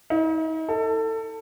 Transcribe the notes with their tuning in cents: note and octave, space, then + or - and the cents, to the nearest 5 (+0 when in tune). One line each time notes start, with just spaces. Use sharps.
D#4 +45
A4 +25